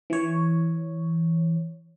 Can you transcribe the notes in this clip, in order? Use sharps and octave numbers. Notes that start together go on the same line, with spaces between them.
E3 C#5